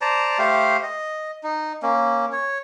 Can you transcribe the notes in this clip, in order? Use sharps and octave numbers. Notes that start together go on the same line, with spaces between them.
C5 D5 A5 A#5
A3 G4 C5 F5
D#5
D#4
A#3 C#4
C#5